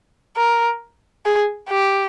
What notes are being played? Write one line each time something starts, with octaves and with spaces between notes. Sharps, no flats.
A#4
G#4
G4